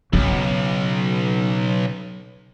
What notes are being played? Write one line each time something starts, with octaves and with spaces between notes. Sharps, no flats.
B1 C#3